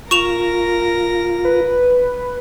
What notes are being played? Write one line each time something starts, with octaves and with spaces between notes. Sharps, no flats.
F4 A#4 C#6 A#6 E7 F7
B4